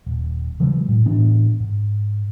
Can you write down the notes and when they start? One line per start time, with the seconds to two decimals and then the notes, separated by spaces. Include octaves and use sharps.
0.06 D#1
0.60 C#3 E3 F#3 G#3
0.88 A2
1.06 A2 E3 B3 D4
1.60 G#2